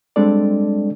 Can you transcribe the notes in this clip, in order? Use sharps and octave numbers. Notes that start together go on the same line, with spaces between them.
G3 G#3 C4 D4 A4 D5